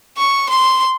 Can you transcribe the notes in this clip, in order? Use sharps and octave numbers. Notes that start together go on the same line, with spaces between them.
C#6
C6